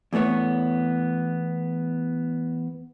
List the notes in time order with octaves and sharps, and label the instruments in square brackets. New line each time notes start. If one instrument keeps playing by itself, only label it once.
[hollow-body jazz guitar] E2 E3 A3 B3 C#5